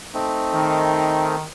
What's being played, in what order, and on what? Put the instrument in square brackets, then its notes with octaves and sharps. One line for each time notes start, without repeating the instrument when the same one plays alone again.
[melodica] A3 C4 D#4
[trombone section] D#3